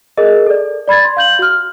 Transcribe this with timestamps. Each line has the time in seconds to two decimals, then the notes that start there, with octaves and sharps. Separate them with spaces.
0.17 G#4 A#4 D#5
0.46 A4 D5
0.88 D5 B5 G#6 A6
1.05 C6
1.17 F5 G6 F#7
1.39 F#4 F6